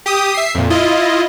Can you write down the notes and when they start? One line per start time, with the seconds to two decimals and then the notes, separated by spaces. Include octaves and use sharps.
0.06 G4 D#6
0.34 E5 C7
0.55 F2 A#2
0.70 E4 F4 D#5